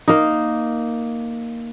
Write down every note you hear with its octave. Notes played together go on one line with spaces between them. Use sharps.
A#3 D#4